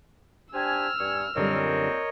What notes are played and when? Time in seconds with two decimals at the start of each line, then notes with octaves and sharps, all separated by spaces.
0.54 D4 G4 C5 G5 G#5 E6 F6
0.99 G2 G#5 C#6
1.36 F#2 A#2 D3 G3 C4 A#4 C#5 D#5